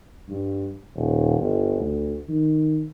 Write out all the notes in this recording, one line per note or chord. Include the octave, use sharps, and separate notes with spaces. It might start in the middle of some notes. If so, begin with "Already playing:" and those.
G2
D#1
G1
D2
D#3